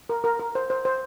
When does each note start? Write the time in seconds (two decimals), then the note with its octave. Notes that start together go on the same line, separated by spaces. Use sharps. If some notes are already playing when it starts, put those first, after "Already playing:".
0.09 A#4
0.24 A#4
0.40 A#4
0.55 C5
0.70 C5
0.85 C5